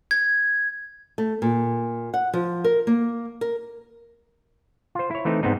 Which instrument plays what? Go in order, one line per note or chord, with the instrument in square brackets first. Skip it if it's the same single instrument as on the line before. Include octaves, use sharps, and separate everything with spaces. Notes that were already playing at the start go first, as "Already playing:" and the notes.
[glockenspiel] G#6
[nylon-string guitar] A3
A#2
F#5
F3
A#4
A#3
A#4
[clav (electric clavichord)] F4 C5
E4 C#5
E3 A3 C4 D#4
G#2 B3 C4 D#4